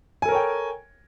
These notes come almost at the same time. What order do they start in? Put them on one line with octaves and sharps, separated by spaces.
G#5 A4 A#4 C#5 G5